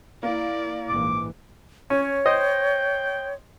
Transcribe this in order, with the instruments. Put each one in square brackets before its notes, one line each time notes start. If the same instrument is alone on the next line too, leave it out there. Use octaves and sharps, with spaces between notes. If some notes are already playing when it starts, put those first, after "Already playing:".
[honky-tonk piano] A#3 [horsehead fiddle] E4 D5
[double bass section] A#1 G#2 E3 [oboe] D6
[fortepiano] C#4 [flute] C#5
[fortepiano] C5 D#5 [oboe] G5